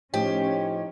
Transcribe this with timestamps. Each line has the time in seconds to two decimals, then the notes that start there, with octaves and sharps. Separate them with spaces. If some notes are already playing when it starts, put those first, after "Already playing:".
0.14 A2 F3 C#4 D#4 G4